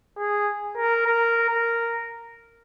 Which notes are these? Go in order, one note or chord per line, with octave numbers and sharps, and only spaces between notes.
G#4
A#4
A#4
A#4